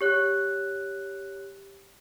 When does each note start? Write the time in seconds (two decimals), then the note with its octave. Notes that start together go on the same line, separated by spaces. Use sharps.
0.01 G4 C#5 F#6